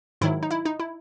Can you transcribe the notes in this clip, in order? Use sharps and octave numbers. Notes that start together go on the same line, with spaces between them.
G#2 D#3 F#3 E4
D#4
E4
D#4
E4